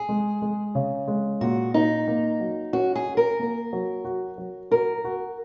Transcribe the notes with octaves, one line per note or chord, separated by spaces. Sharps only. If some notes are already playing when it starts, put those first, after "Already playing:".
Already playing: G#4
G#3
G#3
C#3
G#3
A#2 F#4
A#2 D#4
A#3
F#3
C#4 F#4
G#4
F#4
A#4
A#3
F#3
F#4
F#3
F#4 A#4
F#4